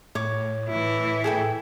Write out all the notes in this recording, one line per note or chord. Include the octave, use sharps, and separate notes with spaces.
A2 C#5 D6
A2 E3 E4
G#4 A4 G5